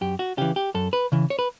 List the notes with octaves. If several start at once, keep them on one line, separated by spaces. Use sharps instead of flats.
F#2 G4
F#4
C#3 E3 G4
G4
F#2 A4
B4
C#3 E3
C#5
B4